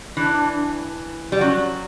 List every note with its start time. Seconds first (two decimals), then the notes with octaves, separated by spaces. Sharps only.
0.17 E3 D4
1.32 G3
1.41 F#3 C#4